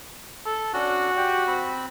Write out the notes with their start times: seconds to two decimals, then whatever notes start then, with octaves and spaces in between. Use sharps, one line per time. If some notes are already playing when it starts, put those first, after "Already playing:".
0.45 A4
0.74 C#4 D4 F#4
1.17 G4 G5
1.47 C4 B5